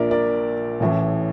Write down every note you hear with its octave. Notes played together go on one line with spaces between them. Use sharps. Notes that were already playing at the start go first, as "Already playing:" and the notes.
Already playing: A#1 A#2 A#4 D5 E5
A#4 D5
A1 A2 E3